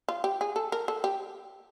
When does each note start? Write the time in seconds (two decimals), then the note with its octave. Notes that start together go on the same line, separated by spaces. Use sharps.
0.08 F4
0.24 G4
0.41 G#4
0.56 A4
0.72 A#4
0.88 A4
1.04 G4